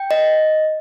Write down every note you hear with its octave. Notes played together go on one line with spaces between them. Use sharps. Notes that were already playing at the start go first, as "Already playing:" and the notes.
Already playing: G5
D#5